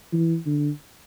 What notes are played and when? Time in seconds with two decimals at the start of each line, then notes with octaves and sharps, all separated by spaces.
0.13 E3
0.46 D3